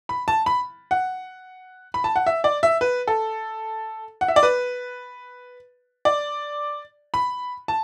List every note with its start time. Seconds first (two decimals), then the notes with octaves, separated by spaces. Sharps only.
0.09 B5
0.28 A5
0.46 B5
0.91 F#5
1.94 B5
2.04 A5
2.16 F#5
2.27 E5
2.44 D5
2.63 E5
2.81 B4
3.07 A4
4.21 F#5
4.28 E5
4.36 D5
4.43 B4
6.05 D5
7.14 B5
7.68 A5